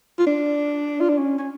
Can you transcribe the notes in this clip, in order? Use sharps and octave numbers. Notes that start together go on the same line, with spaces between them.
F4
D4
F4
D4
C#4
C#4